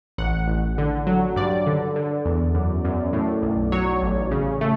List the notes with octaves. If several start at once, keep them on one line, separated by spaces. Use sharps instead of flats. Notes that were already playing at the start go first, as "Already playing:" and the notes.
A1 F#5
A1
D3
F#3
G2 D5
D3
D3
E2
F#2
F#2
A2
B1
F#3 C#5
A1
C#3
A3